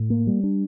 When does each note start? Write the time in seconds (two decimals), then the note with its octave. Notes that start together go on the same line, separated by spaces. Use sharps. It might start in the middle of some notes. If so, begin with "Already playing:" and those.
Already playing: A2
0.10 A#3
0.27 G3
0.43 D4